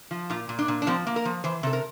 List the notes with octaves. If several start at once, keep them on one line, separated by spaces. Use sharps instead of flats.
F3
A#2 F4
A#2
D4
A#2
D4
F3 C4
A#3
A#4
F3
E3 C5
C3 A4
A#4